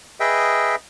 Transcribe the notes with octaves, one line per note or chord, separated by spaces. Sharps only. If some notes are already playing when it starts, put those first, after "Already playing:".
G#4 B4 D#5 E5 G5